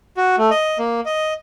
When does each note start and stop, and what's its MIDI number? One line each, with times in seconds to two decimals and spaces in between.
0.17 0.36 66
0.38 0.50 57
0.51 0.78 75
0.79 1.01 58
1.06 1.34 75